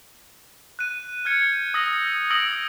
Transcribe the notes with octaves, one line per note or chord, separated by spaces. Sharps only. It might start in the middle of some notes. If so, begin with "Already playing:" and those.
F#6 D#7
F6 G6 G#6 C#7
D#6 E6 G6 A#6
D#6 E6 A#6 D7 F#7